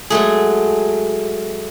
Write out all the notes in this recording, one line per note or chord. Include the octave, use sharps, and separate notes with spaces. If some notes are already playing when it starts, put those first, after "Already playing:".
F#3 G#3 A3 G#4